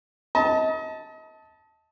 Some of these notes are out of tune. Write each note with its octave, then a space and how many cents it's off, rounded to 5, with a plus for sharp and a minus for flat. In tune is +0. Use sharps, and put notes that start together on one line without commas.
D#5 +35 A5 +0